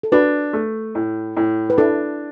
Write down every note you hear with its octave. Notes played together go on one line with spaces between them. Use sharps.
A4
D4 F#4 B4
A3
A2
A2
B4
D4 E4 A4